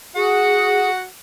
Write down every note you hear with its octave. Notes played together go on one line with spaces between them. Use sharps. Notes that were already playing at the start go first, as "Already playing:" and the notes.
F#4 G#4 F#5